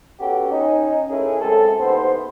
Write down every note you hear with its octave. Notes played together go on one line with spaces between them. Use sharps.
B3 C#4 F#4 G4 A4
C#4 D#4
A3 C#4 E4 G#4 A#4
F#2 G#3 C4 A4
A1 D#2 B3 C5